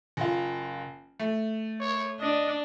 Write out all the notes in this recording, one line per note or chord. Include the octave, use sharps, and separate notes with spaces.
F#1 F4
A3
C#5
D4 D#5